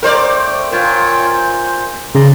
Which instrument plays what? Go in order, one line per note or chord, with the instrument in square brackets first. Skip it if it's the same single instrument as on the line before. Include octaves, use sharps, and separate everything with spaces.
[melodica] A3 G5 [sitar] A#4 C5 D5
[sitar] A#2 [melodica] F4 C#5 G5
[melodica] C5
[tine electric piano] C#3 [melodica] D5 A#5 C6